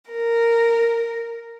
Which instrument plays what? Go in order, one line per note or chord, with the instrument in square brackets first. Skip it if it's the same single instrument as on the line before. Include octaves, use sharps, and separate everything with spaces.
[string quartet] A#4